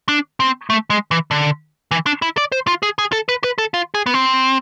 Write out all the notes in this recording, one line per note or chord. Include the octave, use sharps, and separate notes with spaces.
D4
C4
A3
G#3
E3
D3
E3
D4
E4
D5
C5
F4
G#4
G#4
A4
B4
B4
A4
F4
G#4
B3
C4